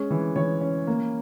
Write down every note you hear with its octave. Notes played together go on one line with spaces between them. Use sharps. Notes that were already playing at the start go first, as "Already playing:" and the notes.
Already playing: G#3 C#4
E3
E3 C#5
C#4
A#3